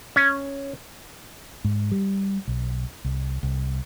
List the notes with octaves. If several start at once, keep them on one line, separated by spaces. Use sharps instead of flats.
C#4
G#2
G3
B1
C2
C2